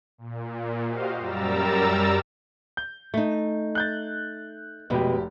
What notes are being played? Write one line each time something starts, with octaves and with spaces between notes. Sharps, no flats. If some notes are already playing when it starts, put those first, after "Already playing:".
A#2
F#4 G4 C5 D#5 F5
F#2 G3 A#4 A#5 E6 A6
G6
A3 D#4
F#6 G6 A6
F1 B2 G#3 G4